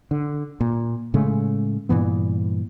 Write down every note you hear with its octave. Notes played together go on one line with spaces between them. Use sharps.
D3
A#2
A2 C#3 G#3 A3
G2 A#2 E3 B3